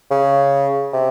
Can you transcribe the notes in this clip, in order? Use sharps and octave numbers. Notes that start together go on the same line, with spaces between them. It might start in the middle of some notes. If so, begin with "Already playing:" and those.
C#3
C3